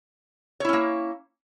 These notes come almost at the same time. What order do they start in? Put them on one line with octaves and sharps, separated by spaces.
C#5 E4 C#4 A#3